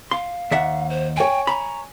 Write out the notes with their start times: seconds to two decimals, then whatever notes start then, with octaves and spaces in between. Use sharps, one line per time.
0.11 F5 C6
0.51 D#2 E5 F#5
0.90 C5
1.17 C#5 G5 G#5
1.47 A#5 B5